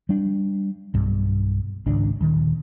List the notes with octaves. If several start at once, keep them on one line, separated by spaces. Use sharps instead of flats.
G3 D4
B1 G2
G#1 C#2 D4
D#1 D#3